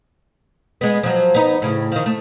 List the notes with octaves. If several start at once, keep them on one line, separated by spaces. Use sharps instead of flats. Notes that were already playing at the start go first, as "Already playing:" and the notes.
G#3 B3
F3 F#3
B3 D#4
A2 C#3
D#3 F3
A3